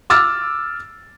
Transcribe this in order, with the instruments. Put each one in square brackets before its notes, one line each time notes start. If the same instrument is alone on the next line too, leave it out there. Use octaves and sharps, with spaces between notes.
[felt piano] D6 E6 F6 A6